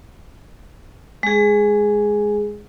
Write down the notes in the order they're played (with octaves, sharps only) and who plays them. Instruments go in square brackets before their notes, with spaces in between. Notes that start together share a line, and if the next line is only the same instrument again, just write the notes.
[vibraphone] G#3 G#4